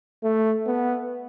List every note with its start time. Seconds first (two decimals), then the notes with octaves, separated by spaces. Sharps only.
0.24 A3
0.67 B3